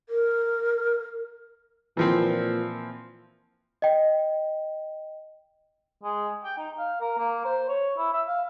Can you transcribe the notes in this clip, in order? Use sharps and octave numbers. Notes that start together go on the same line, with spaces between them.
A#4
A#2 E3 F3 C4
D#5 G5
G#3
G5
D#4
F5
A#4
A#3
C5
C#5
E4
E5
F5